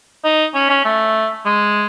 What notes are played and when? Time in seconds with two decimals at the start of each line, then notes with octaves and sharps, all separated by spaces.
0.24 D#4
0.55 C#4
0.69 C#4
0.85 A3
1.46 G#3